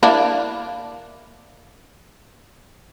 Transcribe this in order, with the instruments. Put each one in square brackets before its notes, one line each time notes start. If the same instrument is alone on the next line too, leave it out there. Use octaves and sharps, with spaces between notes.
[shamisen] A#3 D4 E4